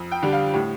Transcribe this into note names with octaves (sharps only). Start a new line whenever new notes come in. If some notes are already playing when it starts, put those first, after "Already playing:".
Already playing: F2
G5
D3 G3 D4
F5
A2 G4